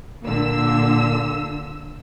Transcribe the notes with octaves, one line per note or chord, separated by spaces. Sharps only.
A#2 D3 E6